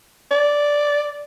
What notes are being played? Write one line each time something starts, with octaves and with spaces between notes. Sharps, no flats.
D5